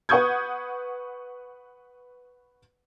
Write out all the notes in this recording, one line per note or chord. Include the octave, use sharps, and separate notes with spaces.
B4 F#5 C#6 D#6 G6 G#6